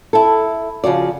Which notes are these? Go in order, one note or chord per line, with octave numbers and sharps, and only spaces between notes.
E4 A4
C#3 F3 F#4 D5